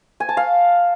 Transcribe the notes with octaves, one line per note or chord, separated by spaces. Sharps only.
G#5
A5
F5